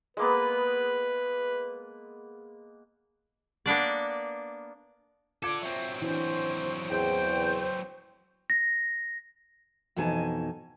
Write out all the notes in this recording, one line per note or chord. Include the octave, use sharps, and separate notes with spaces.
G#3 A#3 B3 B4
A#3 B3 D4 D5
D4 F4 A4 D6 G#6 D7
F#3 C4 E5
E3 D4 C5
E2 C5 G5
A#6
F2 B2 E3 D#4 G#5 A5